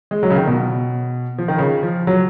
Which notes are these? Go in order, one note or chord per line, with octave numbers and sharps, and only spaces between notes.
G#3
F#3
C#3
D#3
B2
F3
D#3
C#3
F3
F#3